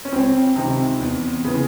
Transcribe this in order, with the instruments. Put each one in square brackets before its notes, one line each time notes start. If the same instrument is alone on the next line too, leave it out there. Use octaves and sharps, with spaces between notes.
[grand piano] C#4
C#2 C4
C3 D#3
E2
C#3 E3